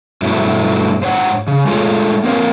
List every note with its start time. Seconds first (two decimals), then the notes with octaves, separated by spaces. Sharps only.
0.22 G2 B2 F#3 A3 E4
1.02 G#2 C5 C#5 F#5
1.48 C#3
1.66 G#3 A3 F4 A4 C#5
2.24 A#3 C4 A#4 C#5 F5